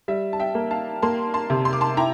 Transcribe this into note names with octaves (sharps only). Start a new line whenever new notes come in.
G3 E5
A5
E5 G5
A#3
F5 A5
A#3 A5 C6
A5 C6
C3
C6
D6
A5 C6
E4 G5 A#5